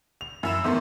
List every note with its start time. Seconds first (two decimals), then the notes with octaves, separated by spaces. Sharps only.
0.21 F7
0.43 F#2 E4 E7
0.64 E2 G#2 D#3 A3